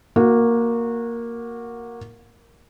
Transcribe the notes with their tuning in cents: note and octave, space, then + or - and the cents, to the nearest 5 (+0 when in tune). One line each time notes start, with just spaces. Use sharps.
A#3 +0 F#4 -20